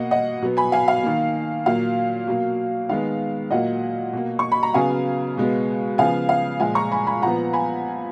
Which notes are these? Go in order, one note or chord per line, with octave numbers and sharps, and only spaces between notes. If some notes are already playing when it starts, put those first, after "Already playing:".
Already playing: B2 A#3 D#5 F#5
D#5 F#5
B2 F#3 B3
G#5 B5
F5 G#5
F5
D#3 A#3
A#2 F#3 A#3 F5
B2 F#3 A#3
D#3 G#3 B3 F5
A#2 F#3 A#3 D#5 F#5
B2 A#3
C#6
B5
A#5
C#3 F#3 B3 F5 G#5
B2 G#3 B3
C#3 F3 B3 F5 G#5
F5
A#2 F3 G#3 F5 G#5
A#5 C#6
G#5 B5
G#5 B5
A#2 F3 B3 F#5 A#5
G#5 B5